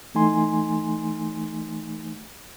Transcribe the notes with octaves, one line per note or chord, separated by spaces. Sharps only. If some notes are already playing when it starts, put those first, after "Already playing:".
E3 A3 D#4 G#5 C6